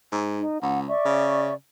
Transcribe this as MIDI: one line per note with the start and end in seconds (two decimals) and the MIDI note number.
0.12 0.43 44
0.38 0.59 63
0.62 0.90 37
0.62 0.81 78
0.88 1.54 74
0.88 1.54 76
0.88 1.54 85
1.05 1.53 49